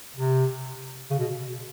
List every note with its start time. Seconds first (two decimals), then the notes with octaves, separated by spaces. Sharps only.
0.16 C3
1.11 C#3
1.19 B2